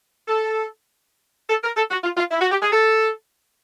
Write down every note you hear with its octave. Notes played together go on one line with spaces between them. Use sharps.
A4
A4
A#4
A4
F#4
F4
F4
E4
F#4
G4
G#4
A4